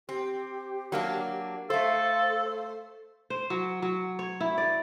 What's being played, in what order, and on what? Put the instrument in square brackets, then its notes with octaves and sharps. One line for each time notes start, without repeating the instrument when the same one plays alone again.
[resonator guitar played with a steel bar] C4 [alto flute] G4
[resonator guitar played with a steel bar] F#3 A#3 D4
[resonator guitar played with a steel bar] A3 C5 [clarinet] A4 [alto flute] F5
[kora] C5
F#3
F#3
C#5
E4
D5